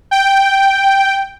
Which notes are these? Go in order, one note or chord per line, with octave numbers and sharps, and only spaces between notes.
G5